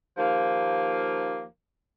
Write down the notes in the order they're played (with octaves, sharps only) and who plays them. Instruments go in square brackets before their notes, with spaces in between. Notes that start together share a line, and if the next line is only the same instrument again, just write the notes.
[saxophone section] D#2 F3 A#3